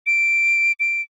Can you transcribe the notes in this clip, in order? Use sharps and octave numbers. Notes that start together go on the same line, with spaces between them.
D7
D7